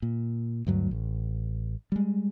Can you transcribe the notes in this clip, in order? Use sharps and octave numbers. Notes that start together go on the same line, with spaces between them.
A#2
D2 G2 F#3
A1
G3 G#3